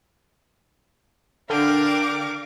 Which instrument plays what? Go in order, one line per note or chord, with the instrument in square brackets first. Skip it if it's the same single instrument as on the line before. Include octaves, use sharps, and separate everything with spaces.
[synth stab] D3 [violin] D4 A#4 [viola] F5 D6 [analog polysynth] G5